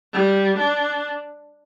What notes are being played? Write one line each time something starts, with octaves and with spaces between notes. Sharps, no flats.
G3
D4